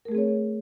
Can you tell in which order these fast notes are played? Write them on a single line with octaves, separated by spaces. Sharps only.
A#4 A3 G#4 C4 C#5